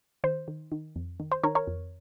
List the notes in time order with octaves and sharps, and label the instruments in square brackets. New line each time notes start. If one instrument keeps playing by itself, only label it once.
[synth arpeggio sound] D#3 C5
D#3
D#3
F2
D#3
C5
D#3 A#4 C#5
A#4 C#5
F2